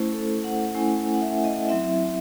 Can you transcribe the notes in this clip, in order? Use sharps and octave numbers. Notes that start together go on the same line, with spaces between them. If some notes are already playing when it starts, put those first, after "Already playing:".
Already playing: A3 C#4 E4 C5
A4
F#5
A3 C#4 E4 G#5
F#5
E5
D#5
F#3 C4 E4 E5